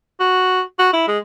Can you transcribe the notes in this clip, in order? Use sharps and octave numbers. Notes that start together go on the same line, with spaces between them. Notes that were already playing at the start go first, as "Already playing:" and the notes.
F#4
F#4
E4
G#3